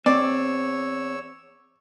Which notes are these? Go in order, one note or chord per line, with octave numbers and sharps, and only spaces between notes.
E2 C4 C#5 D5 E6